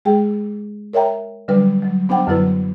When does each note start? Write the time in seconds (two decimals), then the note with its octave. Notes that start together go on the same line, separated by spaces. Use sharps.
0.05 G#3 G#4 G5
0.93 A#4 C#5 E5 G5 A#5
1.48 D3 F#3 G3 D4 B4
1.82 F#3
2.09 B3 D4 C5 F#5 G5
2.27 F#2 D3 F#3 E4 B4